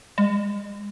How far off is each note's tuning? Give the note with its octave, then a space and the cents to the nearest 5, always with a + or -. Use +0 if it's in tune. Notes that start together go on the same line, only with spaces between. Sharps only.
G#3 -35